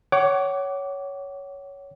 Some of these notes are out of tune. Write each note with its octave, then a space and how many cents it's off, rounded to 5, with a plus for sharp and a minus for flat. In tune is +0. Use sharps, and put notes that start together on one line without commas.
C#5 +10 F#5 +30 D6 -10